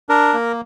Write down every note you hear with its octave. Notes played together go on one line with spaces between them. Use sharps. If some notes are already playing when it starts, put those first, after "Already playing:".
D4 A#4
A#3